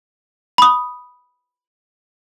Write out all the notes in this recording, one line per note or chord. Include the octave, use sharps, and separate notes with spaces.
B5 D#6